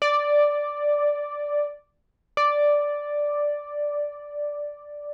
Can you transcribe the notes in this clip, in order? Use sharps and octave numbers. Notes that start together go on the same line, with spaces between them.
D5
D5